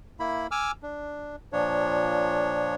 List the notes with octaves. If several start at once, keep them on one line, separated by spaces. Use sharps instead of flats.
A#3 E4 B5
G#5 D6 E6 F6
D4
A#2 F3 D4 C#5